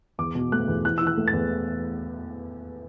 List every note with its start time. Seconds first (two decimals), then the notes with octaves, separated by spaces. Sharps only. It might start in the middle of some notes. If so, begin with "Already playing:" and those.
0.18 E2 D6
0.35 B2
0.52 A3 F#6
0.68 E2
0.85 E3 F#6
0.98 E3 E6
1.07 F#6
1.17 A3
1.28 A6
1.33 E2